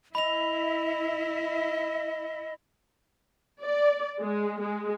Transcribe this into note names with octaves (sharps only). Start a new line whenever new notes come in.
E4 D#5 E5 B5 F7
D5
G#3
G#3